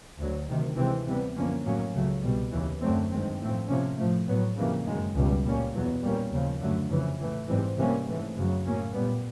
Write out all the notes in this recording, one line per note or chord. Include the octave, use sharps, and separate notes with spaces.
D2 D3 F#3
D2 C3 D#3
C3 E3 G#3 C4
C3 E3 G3 B3
F#2 D3 F3 A#3 C#4
A2 F#3 A#3 C#4
C#2 C#3 F#3 A3
C2 B2 G3
D#2 C#3 E3
F#2 D3 F#3 A3 C4
G2 D#3 G#3 C4
A2 F3 A3 C4
C3 F3 A#3 C#4
A2 F3 A3
A2 F#3 B3
F2 C#3 E3 G3 A#3
F#2 D#3 G#3
C#2 B2 G3
A#2 G3 A#3 C#4
E2 B2 F#3 B3
A#2 G3 A#3 C#4
D#2 C#3 F3
F#2 D3 F#3 A3
F2 C#3 E3
A2 E3 A3
G#2 E3 G3 C4
C3 E3 G3 A#3 C#4
G#2 E3 A3
F#2 C#3 F#3
A2 F#3 A#3 C#4
A#2 G3 B3